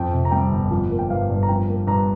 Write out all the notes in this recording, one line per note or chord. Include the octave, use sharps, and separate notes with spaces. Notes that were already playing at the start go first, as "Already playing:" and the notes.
Already playing: F2 G5
C3
A#5
G3 G5
G1
F3
A#3
G5
G2 F5
G2
A#5
F3 G5
A#3
G2 A#5